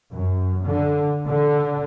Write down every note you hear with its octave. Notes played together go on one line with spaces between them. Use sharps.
F#2
D3
D3